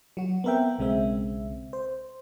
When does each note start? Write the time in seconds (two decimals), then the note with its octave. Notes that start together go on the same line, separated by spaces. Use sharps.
0.17 F#3 F#4
0.44 B3 C4 A#4 E5 G5
0.78 B1 C#3 G#3 C4 E5
1.73 C5